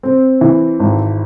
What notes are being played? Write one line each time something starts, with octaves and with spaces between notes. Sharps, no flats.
C4
E3
G#1